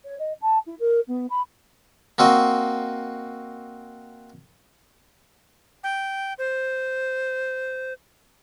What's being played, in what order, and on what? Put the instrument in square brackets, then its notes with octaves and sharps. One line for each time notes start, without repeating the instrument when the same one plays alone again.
[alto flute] C#5
D#5
A5
E4
A#4
B3
B5
[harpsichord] A#3 C4 F#4 D#5
[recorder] G5
C5